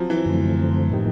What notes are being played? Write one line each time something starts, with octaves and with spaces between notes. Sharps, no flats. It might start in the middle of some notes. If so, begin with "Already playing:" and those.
Already playing: F3 F#3 C4
E3
F#2 D3 F3 A3 C4
A2 F3 A#3 D#4 G4